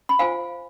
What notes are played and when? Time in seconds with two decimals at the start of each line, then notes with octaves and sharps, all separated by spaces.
0.09 B5
0.19 F4 C5 F5 G#5